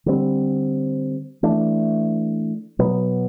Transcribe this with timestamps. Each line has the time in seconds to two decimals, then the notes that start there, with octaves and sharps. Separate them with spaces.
0.06 D3 G3 C4
1.43 E3 A3 D4
2.79 B2 F#3 B3